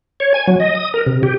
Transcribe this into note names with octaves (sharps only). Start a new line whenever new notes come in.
C#5
G#5
F#3
D#5
D#6
A#4
C3
G4